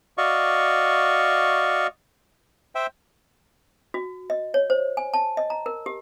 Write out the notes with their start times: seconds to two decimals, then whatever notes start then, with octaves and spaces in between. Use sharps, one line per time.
0.18 F#4 D5 D#5 F5 C#6
2.75 C5 E5 G5
3.94 F#4
4.30 D#5
4.54 C#5
4.70 C5
4.97 G#5
5.14 A5
5.37 D#5
5.50 A#5
5.66 A#4
5.86 G4